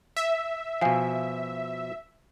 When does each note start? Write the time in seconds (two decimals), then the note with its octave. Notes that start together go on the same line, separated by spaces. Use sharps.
0.17 E5
0.81 B2 F3 F5 G#5 C7